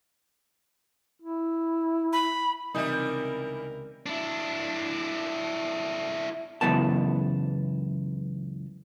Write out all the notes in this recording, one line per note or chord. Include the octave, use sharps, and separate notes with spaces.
E4
B5
C#2 C3 E3 G3 D#4 A#4 E5
D4 E4
C#2 F#2 E3 B3 A5